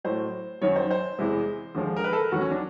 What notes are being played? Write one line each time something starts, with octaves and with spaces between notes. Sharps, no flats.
A2 F#3 C5
F#2 D#3 F#3 C#5
C5
C5
E2 C3 E3 G#3
D#2 D3 F3 G#3
A#4
B4
A4
A#4
D#2 D#3 F#3 F#4
C#4
D4